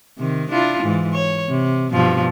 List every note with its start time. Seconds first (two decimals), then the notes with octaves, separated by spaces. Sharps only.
0.18 C3 D#3
0.51 D4 E4 F4
0.83 G#2 E3
1.13 C#5
1.49 C3
1.93 G2 B2 F3